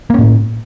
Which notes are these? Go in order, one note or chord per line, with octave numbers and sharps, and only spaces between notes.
A2 A#3 C#4